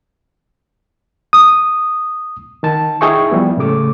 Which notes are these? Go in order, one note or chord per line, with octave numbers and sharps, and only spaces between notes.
D#6
D#3 A5
D#4 E4 G#4 E5 G5 C#6
F3 G3 B3 E4
A2 C#3 A3 D6